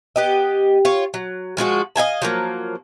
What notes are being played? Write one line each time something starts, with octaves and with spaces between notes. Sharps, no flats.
B3 G4 D#5
F4 C#5
F#3
F3 G#3 F4 F#4
D#5 F5 G#5 A5
F3 F#3 A#3